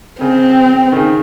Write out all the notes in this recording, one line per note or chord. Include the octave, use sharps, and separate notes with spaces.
C#3 C4
D#3
C#3